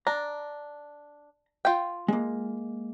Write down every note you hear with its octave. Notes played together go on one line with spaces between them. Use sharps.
D4 A#5
F4 G5
G#3 A#3